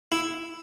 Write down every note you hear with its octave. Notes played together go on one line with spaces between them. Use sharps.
E4